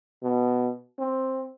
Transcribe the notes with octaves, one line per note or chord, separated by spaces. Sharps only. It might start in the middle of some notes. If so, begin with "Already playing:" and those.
B2
C4